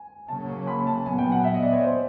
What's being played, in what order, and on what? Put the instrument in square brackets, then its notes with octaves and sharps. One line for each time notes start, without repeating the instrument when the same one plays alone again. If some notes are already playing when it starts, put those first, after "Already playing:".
Already playing: [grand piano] G#5
[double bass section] C#3 F#3 A#3 C#4 [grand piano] A5
[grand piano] B5
A5
[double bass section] A#2 F#3 B3 [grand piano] G#5
[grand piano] G5
F#5
E5
D#5
D5
C#5
C5